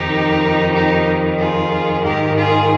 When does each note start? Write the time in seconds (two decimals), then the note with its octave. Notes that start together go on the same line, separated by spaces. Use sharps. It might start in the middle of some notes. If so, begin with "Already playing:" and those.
Already playing: F2 D#3 D#4 G4
0.73 D#4 G4
1.38 F4 G#4
2.04 G#2 D#3 G4 A#4
2.36 F4 G#4